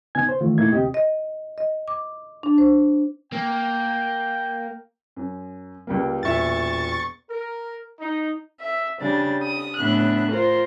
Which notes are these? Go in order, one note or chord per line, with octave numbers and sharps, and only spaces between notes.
C#3 B3 D#4 G#5 G#6
C5
D#3 E3 A3 F4
A#2 A3 A#3 D#4 E4 G#6
D2 C3 C4 G4 D#5
D#5
D#5
D6
D4
C5
A#3 G5
F#2
C#2 G3 A#3
E1 A#2 E5 C#6 A6
A#4
D#4
E5
C#3 G3 D4 A6
D#6
A2 C#3 B3 D4 E5 F#6
F4 A#4 C5